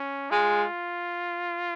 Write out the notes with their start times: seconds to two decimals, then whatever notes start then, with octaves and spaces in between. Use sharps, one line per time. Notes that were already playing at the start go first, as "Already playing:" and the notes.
Already playing: C#4
0.31 G#3 F4